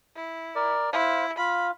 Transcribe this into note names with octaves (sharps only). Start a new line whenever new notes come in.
E4
A#4 D5
E4 C5 F5
F4 F5 B5